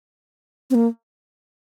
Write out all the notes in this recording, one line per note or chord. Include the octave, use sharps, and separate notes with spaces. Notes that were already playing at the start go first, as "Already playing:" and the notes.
C4
A#3